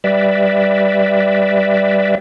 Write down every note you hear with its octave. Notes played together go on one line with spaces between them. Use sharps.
G3 B4 D5 E5